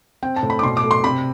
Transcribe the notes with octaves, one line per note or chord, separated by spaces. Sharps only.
C4 G5
A5
A2
B5
D6
B2 C6
D6
A3
C6
C3 B5